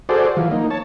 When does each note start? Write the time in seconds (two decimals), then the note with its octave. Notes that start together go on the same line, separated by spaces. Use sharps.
0.09 F#4 G#4 A4 C5 D5
0.37 E3 F#3 F4
0.51 A#3 D#4
0.70 C#5 A5